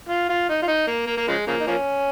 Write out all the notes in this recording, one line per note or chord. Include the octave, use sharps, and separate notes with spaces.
F4
F4
D#4
F4
D#4
A#3
A#3
A#3
C#3 F3 G#3
C#3 F3 A#3
D#4
F3 A#3 C#4